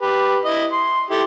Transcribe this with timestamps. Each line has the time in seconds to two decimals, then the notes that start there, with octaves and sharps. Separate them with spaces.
0.02 G4 B4
0.45 E4 D#5
0.72 C6
1.10 E4 G4 A4